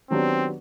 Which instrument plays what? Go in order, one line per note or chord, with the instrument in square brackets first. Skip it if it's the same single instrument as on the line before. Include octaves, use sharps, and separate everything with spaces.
[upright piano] D#3 F#3 B3 D4 G4 [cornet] C4